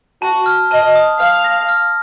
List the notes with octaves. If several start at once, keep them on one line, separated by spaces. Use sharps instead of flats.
F#4 A5
F6
D#5 A5
D#6
F5 F6
A#6
F6